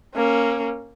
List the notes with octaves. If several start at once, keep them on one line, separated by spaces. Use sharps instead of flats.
A#3 C#4